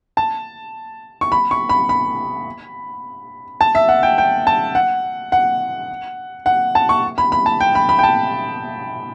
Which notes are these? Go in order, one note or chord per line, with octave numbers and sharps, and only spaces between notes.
A5
C#6
B5
C#6
B5
B5
A5
E5
F#5
G5
G5
A5
F#5
F#5
F#5
A5
C#6
B5
B5
A5
G5
B5
B5
G5
A5